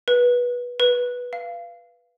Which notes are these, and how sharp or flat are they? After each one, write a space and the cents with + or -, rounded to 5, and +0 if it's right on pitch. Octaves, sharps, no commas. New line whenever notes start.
B4 -20
B4 -10
F5 -20